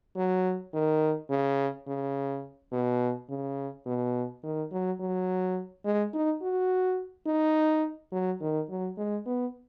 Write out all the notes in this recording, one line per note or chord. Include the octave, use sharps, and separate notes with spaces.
F#3
D#3
C#3
C#3
B2
C#3
B2
D#3
F#3
F#3
G#3
D#4
F#4
D#4
F#3
D#3
F#3
G#3
B3